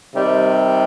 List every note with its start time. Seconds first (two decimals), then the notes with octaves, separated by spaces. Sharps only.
0.15 C3 D#3 G3